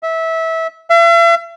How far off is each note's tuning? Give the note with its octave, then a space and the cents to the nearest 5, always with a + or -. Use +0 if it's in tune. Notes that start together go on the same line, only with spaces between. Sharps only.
E5 -20
E5 +45